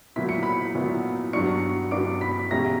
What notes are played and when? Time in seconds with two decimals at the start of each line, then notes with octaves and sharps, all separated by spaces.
0.16 A#2 F#3 B3 E4 B6
0.29 C#7
0.43 B5 B6
0.75 A#2 F#3 B3 E4
1.33 G2 F#3 B3 D4 C#6 C#7
1.91 G2 F#3 B3 D4 D6 D7
2.21 B5 B6
2.51 E2 B2 G3 C#4 E4 A#5 A#6